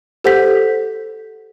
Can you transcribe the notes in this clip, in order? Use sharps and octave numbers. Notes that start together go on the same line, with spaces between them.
G4 A4 C5 F#5 G6 B6